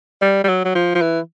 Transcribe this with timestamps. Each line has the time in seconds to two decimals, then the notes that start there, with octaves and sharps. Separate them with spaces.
0.22 G3
0.44 G3
0.48 F#3
0.65 F#3
0.75 F3
0.95 F3
1.02 E3